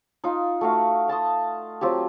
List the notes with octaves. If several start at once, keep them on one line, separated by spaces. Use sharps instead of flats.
D#4 F4
A3 F#4 F5
F5 A5 C6 D#6
F#3 C4 F4 G4